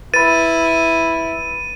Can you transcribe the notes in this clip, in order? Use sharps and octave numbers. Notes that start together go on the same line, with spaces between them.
E4 B4 B5 A6 D#7